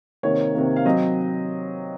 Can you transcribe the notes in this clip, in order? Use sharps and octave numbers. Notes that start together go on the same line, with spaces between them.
C3 D#3 A#3 C#5
C3 D#3 A#3
F5
F#3 C4 D#5